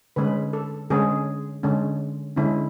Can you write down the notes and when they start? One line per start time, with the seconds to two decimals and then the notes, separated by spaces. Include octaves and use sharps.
0.16 D3 G#3 C#4 B4
0.53 A4
0.90 D3 G#3 C#4 G#4
1.63 D3 G#3 C#4
2.36 D3 G#3 C#4 E4